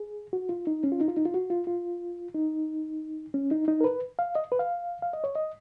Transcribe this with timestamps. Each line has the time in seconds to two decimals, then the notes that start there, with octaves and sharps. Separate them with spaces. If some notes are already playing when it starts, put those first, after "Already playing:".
Already playing: G#4
0.33 F#4
0.49 F4
0.67 D#4
0.84 C#4
0.92 F4
1.01 D#4
1.08 F4
1.17 D#4
1.25 F4
1.34 F#4
1.50 F4
1.67 F4
2.35 D#4
3.34 C#4
3.51 D#4
3.68 D#4
3.81 A#4
3.84 B4
4.19 F5
4.35 D#5
4.52 B4
4.59 F5
5.02 F5
5.13 D#5
5.24 C#5
5.36 D#5